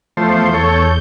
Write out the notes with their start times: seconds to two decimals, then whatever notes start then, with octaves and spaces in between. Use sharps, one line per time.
0.17 E2 F3 A3 C5 G6
0.54 A4 C#5